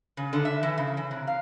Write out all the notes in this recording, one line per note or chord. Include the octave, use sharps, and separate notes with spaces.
C#3
D3
E5
E3
C#3
E3
C3
F5